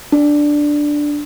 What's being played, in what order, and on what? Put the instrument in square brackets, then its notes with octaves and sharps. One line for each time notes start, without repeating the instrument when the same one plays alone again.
[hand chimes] D4